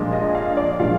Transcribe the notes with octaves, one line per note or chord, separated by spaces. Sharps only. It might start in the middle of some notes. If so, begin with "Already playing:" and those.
Already playing: A#2 F3 G#3 D4
D#5
F5
D5
A#2 F3 G#3 D4 F5